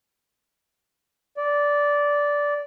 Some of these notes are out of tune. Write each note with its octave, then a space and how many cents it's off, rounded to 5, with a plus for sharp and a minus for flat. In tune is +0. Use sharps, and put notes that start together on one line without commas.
D5 -10